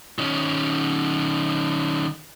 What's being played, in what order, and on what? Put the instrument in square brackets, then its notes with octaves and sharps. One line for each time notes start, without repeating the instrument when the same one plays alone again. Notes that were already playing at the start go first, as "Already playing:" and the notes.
[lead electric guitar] D#3 C#4